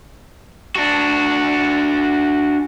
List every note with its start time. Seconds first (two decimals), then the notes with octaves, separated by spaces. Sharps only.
0.76 D4 F#4